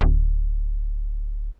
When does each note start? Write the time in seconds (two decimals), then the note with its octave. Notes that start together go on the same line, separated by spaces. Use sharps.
0.01 D1